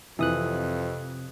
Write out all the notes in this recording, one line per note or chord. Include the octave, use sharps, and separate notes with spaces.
F2 C3 E3 F3 D#6 F#6